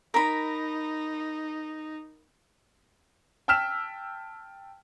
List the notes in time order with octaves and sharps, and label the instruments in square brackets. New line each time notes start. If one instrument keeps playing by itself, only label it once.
[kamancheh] D#4 [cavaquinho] A#4 B5
[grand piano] G5 A5 E6 F6 B6 E7